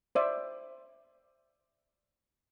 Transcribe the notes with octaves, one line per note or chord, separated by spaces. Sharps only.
C5 D5 E5